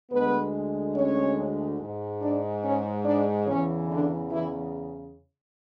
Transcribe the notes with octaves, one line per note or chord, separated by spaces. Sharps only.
D2 D3 G#3 B3 B4
C#4 C#5
G#2 G#3
D4 D5
C#4 C#5
D4 D5
E2 C#3 E3 C#4 C#5
D3 D4
E3 E4